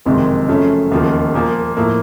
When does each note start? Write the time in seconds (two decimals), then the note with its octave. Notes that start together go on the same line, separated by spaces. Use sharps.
0.05 F#1 F2 C3 D#3 G#3
0.48 F#2 C#3 F3 A3 C#4
0.91 E1 D#2 C#3 F3
1.34 A#2 F3 A#3
1.77 A2 F3 A#3